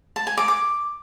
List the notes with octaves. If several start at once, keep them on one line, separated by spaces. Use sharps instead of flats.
A5
G#5
D6
D6